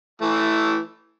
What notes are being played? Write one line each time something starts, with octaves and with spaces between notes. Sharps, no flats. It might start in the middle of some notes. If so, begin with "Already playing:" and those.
E3 A3